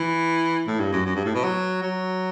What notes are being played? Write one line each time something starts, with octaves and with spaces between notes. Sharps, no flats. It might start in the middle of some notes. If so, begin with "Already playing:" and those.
Already playing: E3
A2
G2
F#2
F#2
G2
A2
B2
F#3
F#3